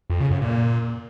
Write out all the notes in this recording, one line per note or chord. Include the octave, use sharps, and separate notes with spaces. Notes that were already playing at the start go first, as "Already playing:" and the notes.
F2
C#3
F#2
A#2